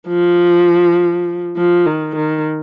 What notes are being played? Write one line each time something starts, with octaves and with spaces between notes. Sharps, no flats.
F3
F3
D#3
D#3